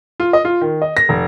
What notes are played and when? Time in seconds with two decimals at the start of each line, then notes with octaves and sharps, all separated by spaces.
0.20 F4
0.33 D#5
0.45 F4
0.61 D#3
0.82 D#5
0.97 A#6
1.09 F1